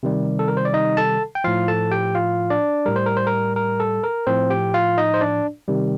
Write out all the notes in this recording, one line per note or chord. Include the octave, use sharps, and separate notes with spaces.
C3 D#3 G3
A4
A#4
C5
D5
D#4 D#5
A4 A5
G5
A2 F3 F4 F5
A4 A5
G4 G5
F4 F5
D4 D5
A2 G3 A#4
C5
A#4
C5
A#4
A#4
A4
A#4
A2 F3 C4 C5
G4 G5
F4 F5
D#4 D#5
C5
D4 D5
C3 D#3 G3